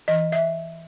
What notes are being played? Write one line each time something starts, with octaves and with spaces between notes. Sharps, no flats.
E3 D#5
E5